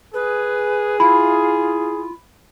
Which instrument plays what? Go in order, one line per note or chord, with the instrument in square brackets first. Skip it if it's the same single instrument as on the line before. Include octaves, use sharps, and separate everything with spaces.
[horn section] G#4 [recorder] B4
[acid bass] E4 [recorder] F4 [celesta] B5